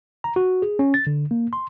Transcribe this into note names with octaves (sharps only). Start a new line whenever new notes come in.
A#5
F#4
G#4
C#4
A6
D3
A#3
C6